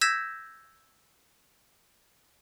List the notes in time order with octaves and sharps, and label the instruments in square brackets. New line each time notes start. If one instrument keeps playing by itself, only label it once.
[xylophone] E6 G6 G#6 A#6 B6 E7